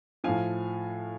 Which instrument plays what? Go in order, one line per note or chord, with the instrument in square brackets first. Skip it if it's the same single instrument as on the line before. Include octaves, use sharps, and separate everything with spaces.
[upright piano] A2 F3 F5 G#5